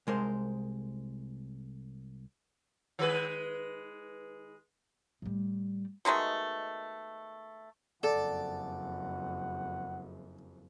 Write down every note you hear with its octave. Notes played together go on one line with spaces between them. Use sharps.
C2 G#3 A#4 C5
D#3 G#3 B4
A2 G3
B2 D#3 G#3 A3
F#1 F2 A4 D5 F#5